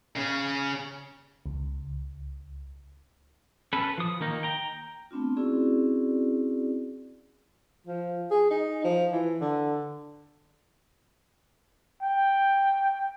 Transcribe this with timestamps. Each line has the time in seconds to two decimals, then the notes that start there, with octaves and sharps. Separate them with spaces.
0.16 C#3 C#4
1.46 C#2
3.73 C#4 A4 B4
3.98 F3 D#6
4.20 D#3 A#3 D#4
4.43 G5 A#5
5.11 A3 B3 C4 D4 F4
5.37 C4 C#4 E4 F#4 G#4 D5
7.87 F3
8.31 G#4
8.50 D#4
8.84 F3
9.12 E3
9.41 D3
12.02 G5